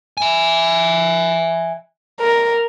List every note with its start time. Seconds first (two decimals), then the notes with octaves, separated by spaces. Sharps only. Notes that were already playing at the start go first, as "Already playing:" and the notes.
0.17 E5 G#5
2.20 A#4